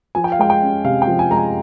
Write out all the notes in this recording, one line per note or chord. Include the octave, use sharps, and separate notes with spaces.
F3 G#5
G5
F5
G#3 G5
G5
C#4
C3 F5
G5
F3
G#5
G#3 A#5
G#5